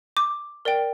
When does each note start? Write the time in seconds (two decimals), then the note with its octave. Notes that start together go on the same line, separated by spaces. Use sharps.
0.17 D6
0.65 A#4 D5 G5